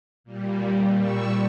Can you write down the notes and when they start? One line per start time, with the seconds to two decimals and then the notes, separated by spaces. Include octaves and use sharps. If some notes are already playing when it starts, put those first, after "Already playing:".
0.24 A#2 G3
0.98 A#2 G3 C#6 E6